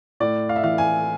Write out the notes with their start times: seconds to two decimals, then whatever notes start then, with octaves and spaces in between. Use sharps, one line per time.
0.20 A2 D5
0.49 F5
0.56 E5
0.63 E3 F5
0.78 G#5